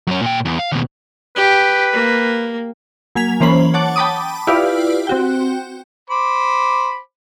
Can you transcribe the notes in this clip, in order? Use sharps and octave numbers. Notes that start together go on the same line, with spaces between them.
F#2 C#4
A#2 G5
E2
F5
D#2 B2
G4 B4
A#3
F#3 A#3 G#5 G#6 B6 F7
E3 A#3 C#4 C5 B5 F#7
C#5 F#5 A5 D6
G5 A5 B5 D6 D#6
E4 F4 G4 B4 D5 F5
C4 F#4 G5
C5 B5 D6